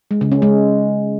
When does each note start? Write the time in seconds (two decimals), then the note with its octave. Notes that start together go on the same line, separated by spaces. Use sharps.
0.11 G#3
0.21 C#3
0.32 C#4
0.42 G#3